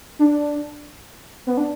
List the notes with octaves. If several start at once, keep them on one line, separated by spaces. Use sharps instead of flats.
D4
B3
D4